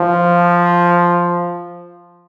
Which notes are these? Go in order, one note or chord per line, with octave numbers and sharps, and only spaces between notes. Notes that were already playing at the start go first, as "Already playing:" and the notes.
Already playing: F3